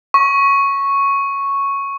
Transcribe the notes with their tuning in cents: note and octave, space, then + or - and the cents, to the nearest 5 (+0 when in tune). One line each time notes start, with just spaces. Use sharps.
C#6 -5